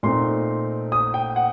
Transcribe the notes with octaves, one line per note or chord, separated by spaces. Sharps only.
A#2 A3 C4 D#4 C6
D#6
G5
F#5